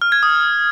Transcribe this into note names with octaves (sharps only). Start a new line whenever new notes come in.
F6
G#6
D#6